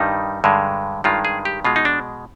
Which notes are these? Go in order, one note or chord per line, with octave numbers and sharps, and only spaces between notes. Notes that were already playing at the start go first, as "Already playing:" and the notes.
Already playing: G2 D#3 G3 D#4
G2 D3 G#3
G2 D#3 G#3 F4
G#4
G4
B2 G#3 F4
D#4
D4